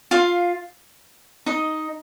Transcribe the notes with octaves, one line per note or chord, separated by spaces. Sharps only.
F4 F5
D#4 D#5